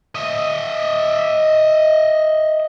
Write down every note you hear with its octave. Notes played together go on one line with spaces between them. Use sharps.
D#5 E5